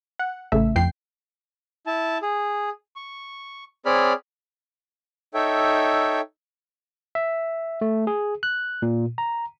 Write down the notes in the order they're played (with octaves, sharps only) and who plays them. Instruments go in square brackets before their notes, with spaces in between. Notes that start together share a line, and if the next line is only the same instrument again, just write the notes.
[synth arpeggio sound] F#5
A1 C#3 A3 E5
F2 G5 C7
[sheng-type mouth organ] E4 A5
G#4
C#6
C4 G#4 C#5 D5 B5 F6
D#4 A4 C#5 E5 G5
[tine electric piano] E5
A3
G#4
F#6
A#2
A#5